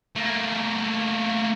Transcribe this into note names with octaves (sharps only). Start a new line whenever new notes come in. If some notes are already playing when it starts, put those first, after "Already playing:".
A3 A#3